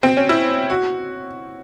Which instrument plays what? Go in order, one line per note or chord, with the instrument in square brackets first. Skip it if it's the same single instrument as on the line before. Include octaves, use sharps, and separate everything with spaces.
[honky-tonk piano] C4
C#4
E4
F#4